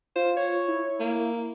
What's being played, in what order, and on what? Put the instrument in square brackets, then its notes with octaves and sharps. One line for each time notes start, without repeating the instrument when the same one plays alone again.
[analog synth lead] F4 [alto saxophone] C5
[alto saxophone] C#5
[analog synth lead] E4
[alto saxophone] A#3